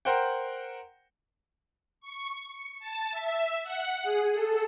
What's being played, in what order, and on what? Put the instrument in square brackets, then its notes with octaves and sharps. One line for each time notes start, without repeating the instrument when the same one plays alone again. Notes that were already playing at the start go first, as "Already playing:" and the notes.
[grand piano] A#4 C5 F#5 G5
[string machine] C#6
C#7
A5
E5
F#5
G#4
A4